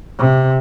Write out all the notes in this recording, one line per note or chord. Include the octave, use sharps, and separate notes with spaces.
C3